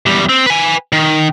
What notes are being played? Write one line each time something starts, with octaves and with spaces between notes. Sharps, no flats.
E2 G3
C4
B4 G#5
D#3